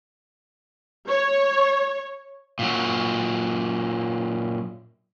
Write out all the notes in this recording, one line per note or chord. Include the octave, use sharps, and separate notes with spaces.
C#5
A#2 F#3